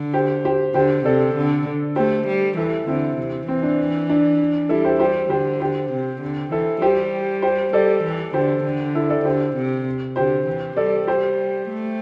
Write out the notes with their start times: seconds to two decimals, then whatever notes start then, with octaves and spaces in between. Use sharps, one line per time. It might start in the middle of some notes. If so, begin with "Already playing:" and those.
Already playing: D3
0.14 G4 C5
0.45 G4 C5
0.74 D3 G4 C5
1.05 C3 A4 D5
1.36 D3
1.96 A3 G4 C5
2.27 G3
2.56 E3 E4 A4
2.87 D3 C4 E4
3.17 C3
3.48 E3 C4
3.63 D4
4.10 D4
4.69 G3 E4 A4
4.85 G4 C5
4.99 G3 G4 C5
5.30 D3 G4 C5
5.60 G4 C5
5.92 C3
6.22 D3
6.51 E3 E4 A4
6.82 G3 G4 C5
7.42 G4 C5
7.73 G3 A4 D5
8.03 E3
8.34 D3 G4 C5
8.64 D3
8.95 E4 A4
9.10 A4 D5
9.25 D3 G4 C5
9.56 C3
10.16 D3 G4 C5
10.46 E3
10.77 G3 A4 D5
11.07 G3 G4 C5
11.68 A3